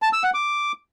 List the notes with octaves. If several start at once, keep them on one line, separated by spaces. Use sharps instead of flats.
A5
E6
F#5
D6